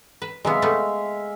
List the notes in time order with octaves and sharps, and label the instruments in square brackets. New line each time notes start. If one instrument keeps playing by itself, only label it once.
[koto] B4
[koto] C3 F#3 B3 [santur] G#3 E5 F5
[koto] G3 A3 B3